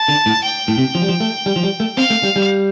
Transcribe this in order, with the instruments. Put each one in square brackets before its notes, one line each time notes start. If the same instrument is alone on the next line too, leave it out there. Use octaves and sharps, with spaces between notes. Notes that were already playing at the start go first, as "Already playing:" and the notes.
Already playing: [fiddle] A5
[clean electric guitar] D3
A2
[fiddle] G5
[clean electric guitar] A2
C3
F3
G3
F3
A3
G3
F3
G3
A3
[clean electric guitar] C4 [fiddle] F5
[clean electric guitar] A3
G3
G3